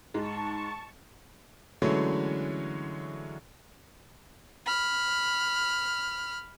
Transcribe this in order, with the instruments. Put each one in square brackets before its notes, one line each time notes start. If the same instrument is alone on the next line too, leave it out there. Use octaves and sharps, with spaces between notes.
[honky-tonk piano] G#2 G#3 [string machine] A5 C#6
[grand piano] D3 E3 F#3 G#3 A3 C#4
[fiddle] B5 F6